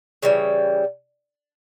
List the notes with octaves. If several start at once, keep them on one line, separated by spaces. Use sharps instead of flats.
C#3 E3 G3